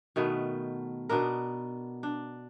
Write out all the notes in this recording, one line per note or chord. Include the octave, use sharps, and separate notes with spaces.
B2 D#3 A3 B3
B2 B3 D4 A#4
D4